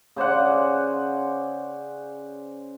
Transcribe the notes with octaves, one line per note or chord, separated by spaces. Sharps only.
C#3 C5 D5 F#5